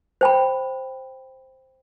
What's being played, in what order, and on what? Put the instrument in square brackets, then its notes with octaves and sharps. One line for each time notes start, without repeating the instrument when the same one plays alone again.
[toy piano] C5 G5 B5